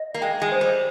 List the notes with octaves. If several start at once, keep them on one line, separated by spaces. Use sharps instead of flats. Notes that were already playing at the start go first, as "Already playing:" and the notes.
Already playing: D#5
A#3
G#3 G5
G#3
C5
G3